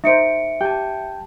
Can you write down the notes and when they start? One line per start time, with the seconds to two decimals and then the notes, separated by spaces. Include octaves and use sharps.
0.04 D#4 C5 E5 C#7 D7
0.61 G4 G5 A5